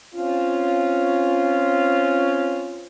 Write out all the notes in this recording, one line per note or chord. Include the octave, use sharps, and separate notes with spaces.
C4 C#4 F4